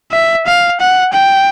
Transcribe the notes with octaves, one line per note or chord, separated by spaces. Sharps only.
E5
F5
F#5
G5